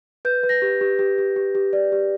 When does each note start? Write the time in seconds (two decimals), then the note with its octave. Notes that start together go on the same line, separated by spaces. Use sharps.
0.25 B4 G6
0.43 B4
0.49 A#6
0.62 G4
0.81 G4
0.99 G4
1.18 G4
1.36 G4
1.55 G4
1.73 D5
1.92 G4